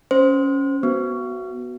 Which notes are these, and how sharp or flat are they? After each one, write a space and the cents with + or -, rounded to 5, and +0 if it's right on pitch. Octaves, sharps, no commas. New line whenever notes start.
C#4 +0 C5 +0
B3 +0 F#4 +10